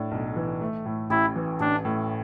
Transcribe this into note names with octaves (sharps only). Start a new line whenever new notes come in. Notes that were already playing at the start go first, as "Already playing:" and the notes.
Already playing: A2 D4
B1
E3
A3
A2
A1 E4
E3
A1 D4
A2